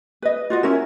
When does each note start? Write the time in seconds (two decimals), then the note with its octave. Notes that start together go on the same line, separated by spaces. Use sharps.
0.22 B4 D#5
0.50 F4 F#4 D#5
0.63 C#4 E4 A#4